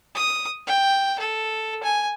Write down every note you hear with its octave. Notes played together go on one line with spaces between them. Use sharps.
D#6
G5
A4
G#5